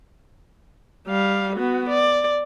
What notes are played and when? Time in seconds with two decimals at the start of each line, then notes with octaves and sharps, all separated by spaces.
1.08 G3 F5
1.55 B3 F#4
1.89 D5